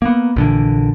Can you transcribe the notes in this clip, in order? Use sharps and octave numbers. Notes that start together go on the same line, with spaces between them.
A#3 B3
A#1 D3 E3